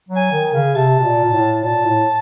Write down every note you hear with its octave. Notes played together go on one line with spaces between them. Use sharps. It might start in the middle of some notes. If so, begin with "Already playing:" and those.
F#3
G#5
D#3
G#5
C#3
C3 A5
B2
A#2
A#2
A2
A#2 A5
A2